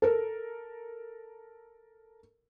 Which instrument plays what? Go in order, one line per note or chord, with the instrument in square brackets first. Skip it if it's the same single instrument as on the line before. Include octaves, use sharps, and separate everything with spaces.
[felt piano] A4 A#4